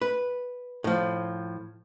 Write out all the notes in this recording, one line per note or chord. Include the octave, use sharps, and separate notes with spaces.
B4
A2 F3